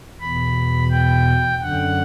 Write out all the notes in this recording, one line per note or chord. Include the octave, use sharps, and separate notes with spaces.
E2 B2 B5
G5
F#2 D3 F#5